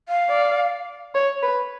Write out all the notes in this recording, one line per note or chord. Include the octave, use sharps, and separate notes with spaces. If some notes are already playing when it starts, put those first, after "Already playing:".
F5
D5
C#5
B4